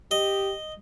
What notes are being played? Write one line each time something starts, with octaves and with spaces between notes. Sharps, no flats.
G4 D#5